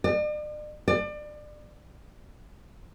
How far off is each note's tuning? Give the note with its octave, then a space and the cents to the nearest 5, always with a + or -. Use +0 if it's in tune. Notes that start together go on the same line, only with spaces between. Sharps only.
D5 +45
D5 +30